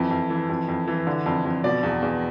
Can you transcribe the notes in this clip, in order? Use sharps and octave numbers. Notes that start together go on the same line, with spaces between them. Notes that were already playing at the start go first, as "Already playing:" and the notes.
Already playing: F2 E3
F2
E3
F2
F2
E3
D3
F2
F2
B2 D5
E2
E2